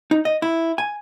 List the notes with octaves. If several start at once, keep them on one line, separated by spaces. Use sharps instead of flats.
D#4
D#5
E4
G#5